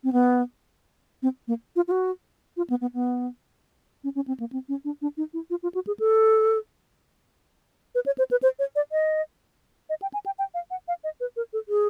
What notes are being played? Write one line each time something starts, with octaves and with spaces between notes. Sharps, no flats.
C4
B3
C4
A#3
F4
F4
F#4
F4
B3
B3
B3
C#4
C#4
C4
A#3
C4
C#4
D4
D4
D#4
E4
F4
F4
F#4
G#4
A4
B4
C#5
C5
B4
C5
C#5
D5
D#5
D#5
G5
G#5
G5
G5
F5
F#5
F5
D#5
B4
A#4
A4
G#4